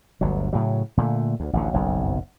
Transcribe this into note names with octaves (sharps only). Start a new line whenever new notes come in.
G1 D2 F#3
A2 C#3 F#3
A#2 D3 E3 A3
D2
A1 D2 D3
F#1 B1 F2